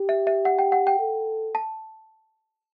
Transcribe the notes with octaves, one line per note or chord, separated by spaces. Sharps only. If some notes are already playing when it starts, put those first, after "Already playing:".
Already playing: G4
E5
E5
F#5
G5
F#5
G5
A4
A5